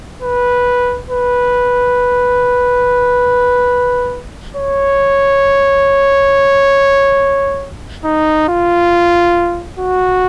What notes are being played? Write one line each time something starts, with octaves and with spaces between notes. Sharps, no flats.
B4
B4
C#5
D#4
F4
F#4